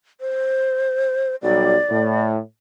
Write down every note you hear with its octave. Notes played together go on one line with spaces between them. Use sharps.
C5
B1 F#3 G3 D5
A2